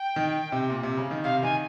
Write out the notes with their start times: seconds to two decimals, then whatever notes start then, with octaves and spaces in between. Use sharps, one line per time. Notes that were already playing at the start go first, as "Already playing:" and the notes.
Already playing: G5
0.16 D#3
0.52 C3
0.70 A#2
0.83 C3
0.97 C#3
1.11 D#3
1.24 C3 F5
1.42 D#3 G#5